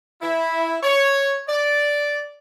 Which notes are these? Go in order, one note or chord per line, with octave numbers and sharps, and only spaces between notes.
E4
C#5
D5